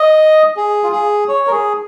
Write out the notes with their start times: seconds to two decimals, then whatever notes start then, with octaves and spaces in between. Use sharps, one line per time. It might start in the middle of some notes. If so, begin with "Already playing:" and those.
Already playing: D#5
0.57 G#4
0.84 F4
0.92 G#4
1.28 C#5
1.47 A#4
1.52 G#4